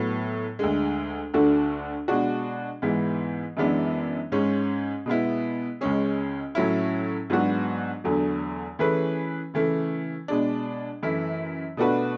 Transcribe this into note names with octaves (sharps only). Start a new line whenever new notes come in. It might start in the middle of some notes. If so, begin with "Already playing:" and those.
Already playing: A2 F#3 B3
D2 D3 G#3
D2 D3 A3 D4 F#4
B2 G#3 D4 F#4
G#2 E3 G#3 B3
F#2 E3 G#3 B3 D4
G#2 G#3 C#4
B2 G#3 B3 E4
C#2 C#3 G#3 C#4 G#4
A2 F#3 C#4 E4
G#2 F#3 B3 D4 F#4
E2 D3 F#3 A3
E3 A3 C#4 G#4 B4
C#3 E3 A3
B2 G#3 D4
F#2 E3 A3 E4
B2 A3 D4 F#4 B4